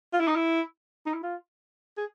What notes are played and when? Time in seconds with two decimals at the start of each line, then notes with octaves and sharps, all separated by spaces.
0.13 F4
0.20 E4
0.28 D#4
0.35 E4
1.06 D#4
1.14 E4
1.23 F4
1.98 G#4